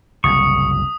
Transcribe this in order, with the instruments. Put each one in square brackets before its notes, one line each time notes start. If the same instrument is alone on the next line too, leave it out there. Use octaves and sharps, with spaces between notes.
[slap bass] F#1 C2 [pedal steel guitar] C#6 [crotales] D#6